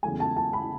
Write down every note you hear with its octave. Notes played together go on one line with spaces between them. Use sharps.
E2 C#3 F#3 A3 G#5
A5
A5
B5